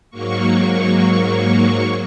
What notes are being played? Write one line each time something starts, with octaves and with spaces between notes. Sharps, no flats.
G#2 F#3 A#3 C#6